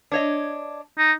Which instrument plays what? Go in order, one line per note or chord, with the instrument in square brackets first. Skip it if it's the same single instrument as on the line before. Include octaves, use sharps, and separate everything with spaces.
[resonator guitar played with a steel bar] D4 C#5 D#5
[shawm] D#4